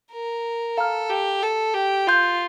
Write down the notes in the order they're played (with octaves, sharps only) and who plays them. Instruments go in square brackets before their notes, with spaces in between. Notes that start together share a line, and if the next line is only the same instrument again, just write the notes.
[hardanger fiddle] A#4
[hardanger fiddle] A4 [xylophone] F5 A#5 F6
[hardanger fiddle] G4
A4
G4
[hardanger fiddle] F4 [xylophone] F5 C6 G6